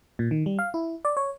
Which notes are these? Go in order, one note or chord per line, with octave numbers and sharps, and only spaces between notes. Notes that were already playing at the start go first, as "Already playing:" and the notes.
A#2
D#3
G3
F5
E4
D5
C#5